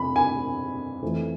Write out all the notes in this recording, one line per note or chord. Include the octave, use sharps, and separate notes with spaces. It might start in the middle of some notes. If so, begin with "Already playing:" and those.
Already playing: F2 C3 F3 B5
G#5
F2 E3 A3